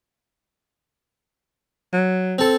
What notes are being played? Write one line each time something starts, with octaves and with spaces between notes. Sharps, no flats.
F#3
C4 A4